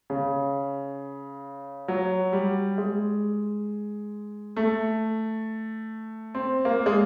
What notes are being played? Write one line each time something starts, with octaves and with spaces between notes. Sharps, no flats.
C#3
F#3
G3
G#3
A3
C4
A#3
G#3